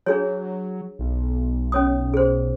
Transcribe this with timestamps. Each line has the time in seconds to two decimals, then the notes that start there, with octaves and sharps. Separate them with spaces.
0.06 F#3 D4 G#4 C#5
0.99 B1
1.72 C#4 C#5 D#6
2.14 G#4 C5